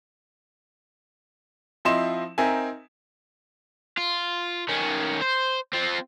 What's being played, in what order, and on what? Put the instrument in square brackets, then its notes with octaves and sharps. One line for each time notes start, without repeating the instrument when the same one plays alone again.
[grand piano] F3 C4 E4 D#5 C6 E7
C4 D#4 A#4 E5 G#5
[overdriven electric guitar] F4
D#3 C#4
C5
C4 F4